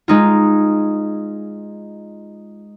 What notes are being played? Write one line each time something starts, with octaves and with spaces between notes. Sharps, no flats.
G#3 D#4 F4